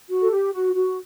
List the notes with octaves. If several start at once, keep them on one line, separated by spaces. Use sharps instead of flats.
F#4
A4
G4
F#4
F#4